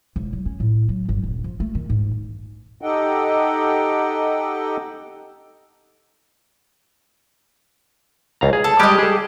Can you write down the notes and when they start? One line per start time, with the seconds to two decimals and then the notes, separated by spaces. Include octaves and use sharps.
0.16 E1
0.33 F#3
0.45 C#4
0.60 A2
0.89 F#3
1.09 G1
1.23 D#1
1.44 F3
1.60 A3
1.75 D#3
1.90 G#2
2.81 D#4 G4 A4 D#5 F#5 G5
8.41 C#2 F5 A#5
8.53 G#4
8.64 A4
8.80 G3 G#3 G4 D#5
8.99 G#4 A4